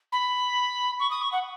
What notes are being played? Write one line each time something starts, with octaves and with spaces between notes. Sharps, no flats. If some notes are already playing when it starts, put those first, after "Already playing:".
B5
C#6
D#6
C#6
F#5